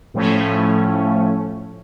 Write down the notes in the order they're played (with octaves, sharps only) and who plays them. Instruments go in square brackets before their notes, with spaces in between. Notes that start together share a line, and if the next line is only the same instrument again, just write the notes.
[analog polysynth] A2 F3 A3 C#4